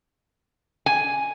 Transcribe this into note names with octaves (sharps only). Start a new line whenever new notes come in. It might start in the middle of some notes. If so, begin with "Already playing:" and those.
G#5